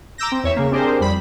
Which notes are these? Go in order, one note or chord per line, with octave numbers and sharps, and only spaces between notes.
A#5 D6 E6 G6 A#6
C4
E2 C#5 E5
C#3 A#3
C4 D4 G4 G#4 A#4 C5
F2 G3 B5